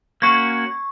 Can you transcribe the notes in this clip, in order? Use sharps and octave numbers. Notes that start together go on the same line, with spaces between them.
A#3 C#4 F#4 C#6 G#6